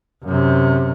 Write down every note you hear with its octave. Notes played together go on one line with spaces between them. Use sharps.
F#2 C3